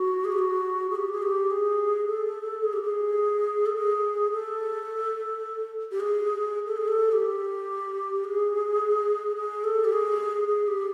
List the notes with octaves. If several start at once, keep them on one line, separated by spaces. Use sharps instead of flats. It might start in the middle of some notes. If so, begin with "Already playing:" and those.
Already playing: F#4
G#4
G4
F#4
G#4
G4
G#4
G4
G#4
A4
G#4
G4
G#4
A4
G#4
A4
G4
G#4
A4
G#4
A4
G4
G#4
G#4
A4
G4
G#4
G#4
G4